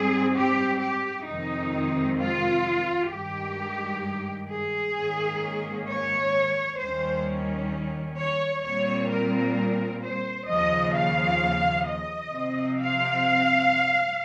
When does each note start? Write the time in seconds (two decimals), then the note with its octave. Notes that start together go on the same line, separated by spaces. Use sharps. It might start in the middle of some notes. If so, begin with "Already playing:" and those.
Already playing: G#2 G3 C4 G#4
0.35 G4
0.81 G4
1.27 F2 C3 D#3 G#3 C4 D#4
2.19 F4
3.11 G2 D#3 G#3 G4
4.49 G#4
4.95 G#2 D#3 A#3 C#4
5.88 C#5
6.80 D#2 D#3 G3 C#4 C5
8.18 C#5
8.64 A#2 G3 C4 C#5
9.11 A#4
10.02 C5
10.48 D#2 C#3 F3 D#5
10.95 F5
11.87 D#5
12.33 C3 F3 C4
12.79 F5